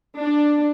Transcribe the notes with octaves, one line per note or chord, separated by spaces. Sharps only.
D4